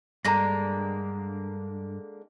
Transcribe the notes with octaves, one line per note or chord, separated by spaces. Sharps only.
G2 D3 G#3 A#3 A#5 A#6